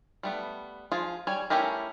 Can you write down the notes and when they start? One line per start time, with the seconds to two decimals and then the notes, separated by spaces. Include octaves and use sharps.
0.23 G3 A3 B3
0.92 F3 F4 G#4
1.27 G3 C#5 G#5
1.50 A3 C#4 E4 G4 A#4